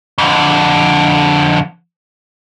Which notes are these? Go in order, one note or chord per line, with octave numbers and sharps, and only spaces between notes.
F2 D3